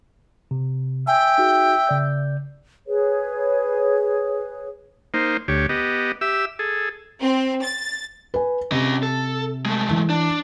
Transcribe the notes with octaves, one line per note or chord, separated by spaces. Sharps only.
C3
E5 G5 G#5
D#4 F#4 G#4
C#3 D5 G6
G#4 B4 C#5
A#3 D#4 C5
D2 G4 C#5
B3 G4 D#5
G4 E5 E6
G#4 A4
C4
A6
B4 G#5
C3 C#4 D#5
A4
G#3 A3
E3
D4